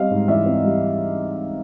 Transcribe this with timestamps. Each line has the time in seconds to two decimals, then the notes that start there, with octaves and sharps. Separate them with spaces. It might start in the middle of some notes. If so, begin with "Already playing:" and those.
Already playing: G3 C4 D#5 F5
0.11 G#2
0.28 E3 D5 E5
0.46 C4
0.64 G3